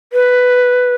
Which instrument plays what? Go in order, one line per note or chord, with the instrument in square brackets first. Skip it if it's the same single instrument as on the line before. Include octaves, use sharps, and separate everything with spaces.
[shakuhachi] B4